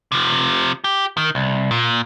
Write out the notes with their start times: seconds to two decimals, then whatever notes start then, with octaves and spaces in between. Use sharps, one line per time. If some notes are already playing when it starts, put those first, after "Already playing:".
0.12 C3 F3
0.84 G4
1.17 D#3
1.35 C2
1.71 A#2